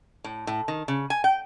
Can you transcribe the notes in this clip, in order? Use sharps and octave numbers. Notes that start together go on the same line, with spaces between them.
A2
A2
D#3
C#3
G#5
G5